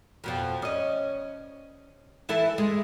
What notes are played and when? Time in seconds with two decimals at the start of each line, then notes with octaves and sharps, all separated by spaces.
0.24 F2 B2 F3
0.62 C#4 D#5
2.29 E3 E4 A4
2.58 G#3